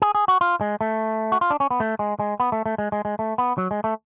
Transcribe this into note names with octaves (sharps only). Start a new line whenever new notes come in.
G#4
G#4
F#4
F4
G#3
A3
F#4
F4
D4
C#4
B3
A3
G#3
G#3
B3
A3
A3
G#3
G#3
G#3
A3
B3
F#3
G#3
A3